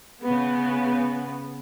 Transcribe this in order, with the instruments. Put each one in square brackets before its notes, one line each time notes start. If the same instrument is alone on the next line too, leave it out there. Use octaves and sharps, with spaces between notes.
[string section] C#3 B3